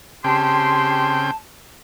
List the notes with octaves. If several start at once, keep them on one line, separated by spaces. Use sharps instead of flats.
C#3 C4 G4 G5 A5 C6